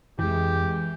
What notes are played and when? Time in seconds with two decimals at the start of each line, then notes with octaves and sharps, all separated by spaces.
0.19 F2 E3 G#3 G4